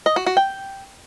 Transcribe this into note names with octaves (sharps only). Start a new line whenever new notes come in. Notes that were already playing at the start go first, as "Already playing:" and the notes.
D#5
F#4
F#4
G5